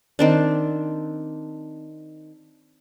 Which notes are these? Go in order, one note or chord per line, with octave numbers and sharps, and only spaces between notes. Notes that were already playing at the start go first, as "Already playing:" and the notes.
D#3 C4 D4